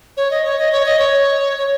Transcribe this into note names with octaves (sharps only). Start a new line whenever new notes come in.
C#5
D#5
C#5
D#5
C#5
D#5
C#5
C#5